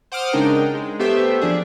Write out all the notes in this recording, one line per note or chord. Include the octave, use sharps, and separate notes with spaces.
C5 F#5 D6 D#6 F6
C#3 G#3 D4 D#4 A#4 G5
G#3
A3 B3 G4 C5 E5
F3 D4 G#4